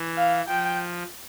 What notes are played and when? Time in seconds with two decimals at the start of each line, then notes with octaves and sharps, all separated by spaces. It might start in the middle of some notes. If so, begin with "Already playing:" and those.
Already playing: E3
0.17 F5
0.48 F3 G5